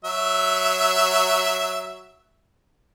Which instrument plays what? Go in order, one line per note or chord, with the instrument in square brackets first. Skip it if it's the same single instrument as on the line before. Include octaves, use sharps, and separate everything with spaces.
[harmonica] F#3 E5